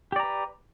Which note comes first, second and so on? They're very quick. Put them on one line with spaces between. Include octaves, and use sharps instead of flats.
G4 D5 A#5 B4